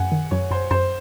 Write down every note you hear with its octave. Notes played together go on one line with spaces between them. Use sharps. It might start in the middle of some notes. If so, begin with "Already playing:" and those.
Already playing: F#2 F#5 G#5
D#3
F#2 C#5
F#2 C5
F#2 C5